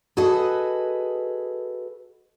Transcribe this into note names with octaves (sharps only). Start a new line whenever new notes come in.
F#4 G#4 A4 B4 D#5